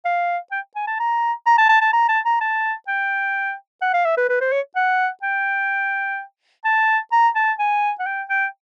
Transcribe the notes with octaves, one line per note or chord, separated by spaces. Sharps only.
F5
G5
G#5
A5
A#5
A#5
A5
A5
A5
A#5
A5
A#5
A5
G5
F#5
F5
E5
B4
B4
C5
C#5
F#5
G5
A5
A#5
A5
G#5
F#5
G5
G5